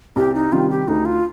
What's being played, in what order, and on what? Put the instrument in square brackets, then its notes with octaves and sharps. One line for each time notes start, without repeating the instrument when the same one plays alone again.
[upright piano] C2 [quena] G4
[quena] D#4
[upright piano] C3 D#3 G3 [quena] F4
[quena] G4
[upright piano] D2 [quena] D#4
[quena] F4